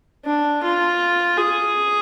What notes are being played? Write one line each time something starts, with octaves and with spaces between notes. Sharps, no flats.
D4
F4
G#4